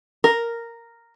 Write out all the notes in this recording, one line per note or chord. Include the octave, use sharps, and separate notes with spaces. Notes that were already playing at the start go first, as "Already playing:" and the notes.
A#4